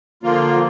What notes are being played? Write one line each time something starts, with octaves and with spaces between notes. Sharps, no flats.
D3 F3 A#3 F4